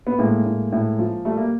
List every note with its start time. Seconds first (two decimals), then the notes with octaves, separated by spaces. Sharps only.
0.07 B3
0.19 A2 G#3 A#3
0.45 A2
0.72 A2
0.99 F3
1.25 G3 A3
1.37 A#3